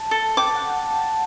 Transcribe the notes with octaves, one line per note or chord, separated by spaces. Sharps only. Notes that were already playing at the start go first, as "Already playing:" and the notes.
Already playing: A5
A4
G5 D6
F#5